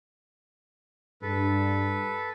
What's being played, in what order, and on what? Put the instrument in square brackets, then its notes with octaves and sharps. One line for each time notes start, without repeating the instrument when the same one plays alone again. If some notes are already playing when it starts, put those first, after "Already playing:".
[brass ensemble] G2 [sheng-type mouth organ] A4 B4